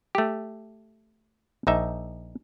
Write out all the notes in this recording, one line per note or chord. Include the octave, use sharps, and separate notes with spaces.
A3 G4
A#1 D#4 E5